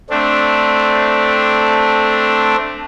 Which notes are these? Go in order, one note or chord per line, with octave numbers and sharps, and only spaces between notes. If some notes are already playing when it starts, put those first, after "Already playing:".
A3 C4 D4